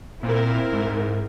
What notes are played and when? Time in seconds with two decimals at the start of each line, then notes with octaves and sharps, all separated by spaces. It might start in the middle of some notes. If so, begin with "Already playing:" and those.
0.23 A#2 C4 E4 A#4
0.73 G#2